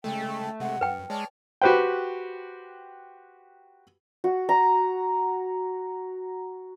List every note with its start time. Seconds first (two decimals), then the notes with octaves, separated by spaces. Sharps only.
0.04 C#3 G#3 A3 A4 G5
0.60 C3 G#3 F#5
0.81 F#2 B4 G5
1.10 G#3 C#5 D5 A5 F6
1.62 F#4 G4 B4 C5 G5
4.24 F#4
4.49 A#5